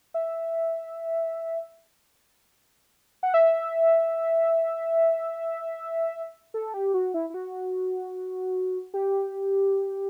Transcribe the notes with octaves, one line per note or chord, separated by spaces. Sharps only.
E5
F#5
E5
A4
G4
F#4
E4
E4
F#4
G4